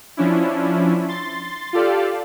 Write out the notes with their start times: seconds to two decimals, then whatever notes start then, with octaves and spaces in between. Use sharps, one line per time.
0.17 F3 C#4 D4 E4
1.08 C6 A6
1.73 F4 G4 A4 D5 F5